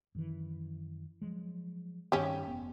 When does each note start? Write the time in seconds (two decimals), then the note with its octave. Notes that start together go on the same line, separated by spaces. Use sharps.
0.15 F#2 D#3 E3
1.22 F3 F#3 G#3
2.12 G2 D#3 C#4 G4
2.47 F1 B3